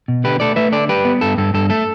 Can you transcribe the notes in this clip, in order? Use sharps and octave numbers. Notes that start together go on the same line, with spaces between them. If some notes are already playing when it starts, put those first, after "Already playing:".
B2
D3 G4 B4
A3 A4 D5
A3 B4 E5
D3 A4 D5
G3 G4 B4
B3
G2 A4
G2 A4
G2 A4
A3 A4